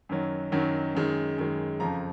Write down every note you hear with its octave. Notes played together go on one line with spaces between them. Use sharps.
F#2 D#3 F#3
F#2 D#3 F#3
F#2 D#3 G#3
F#2 D#3 G#3
F2 C#3 F3 A#5